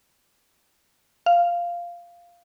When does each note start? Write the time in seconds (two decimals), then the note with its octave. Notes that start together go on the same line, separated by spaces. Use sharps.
1.26 F5